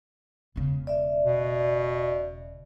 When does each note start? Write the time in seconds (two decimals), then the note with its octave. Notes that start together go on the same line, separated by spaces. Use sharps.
0.56 E1 C#3
0.87 D5 E5
1.24 B2